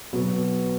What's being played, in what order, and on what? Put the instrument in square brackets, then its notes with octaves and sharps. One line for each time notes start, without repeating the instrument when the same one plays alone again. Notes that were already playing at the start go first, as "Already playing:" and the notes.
[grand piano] B2 F#3 B3